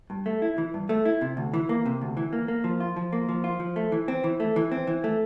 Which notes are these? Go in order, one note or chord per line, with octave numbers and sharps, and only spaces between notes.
G2
A3
E4
E3
G2
A3
E4
C3
D2
E3
A#3
C3
D2
E3
A#3
A#3
F3
F4
F3
A#3
F3
F4
F3
A3
E3
C4
E3
A3
E3
C4
E3
A3